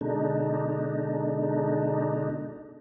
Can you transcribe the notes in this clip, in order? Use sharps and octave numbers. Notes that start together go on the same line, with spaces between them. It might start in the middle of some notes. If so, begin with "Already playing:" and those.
B2 D3 G#3 D4 D#4